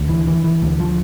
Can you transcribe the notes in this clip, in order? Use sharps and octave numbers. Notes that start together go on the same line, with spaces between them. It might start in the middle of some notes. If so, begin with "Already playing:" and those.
Already playing: D2
E3
E3
E3
D2
F3